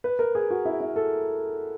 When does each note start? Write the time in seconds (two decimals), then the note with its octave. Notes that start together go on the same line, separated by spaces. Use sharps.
0.04 B4
0.19 A#4
0.35 G#4
0.50 F#4
0.65 E4
0.80 E4
0.96 A4